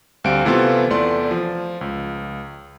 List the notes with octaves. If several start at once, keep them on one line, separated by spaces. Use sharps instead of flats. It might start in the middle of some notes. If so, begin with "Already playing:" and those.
D2 G3 C4 F5 D7
C3 E3 A3 B3 C4 F4
E2 A3 D5 C6
F3
C#2